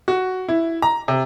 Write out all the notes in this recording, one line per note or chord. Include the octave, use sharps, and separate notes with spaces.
F#4
E4
A#5
C3